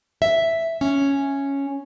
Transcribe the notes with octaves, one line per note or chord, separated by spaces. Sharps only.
E5
C#4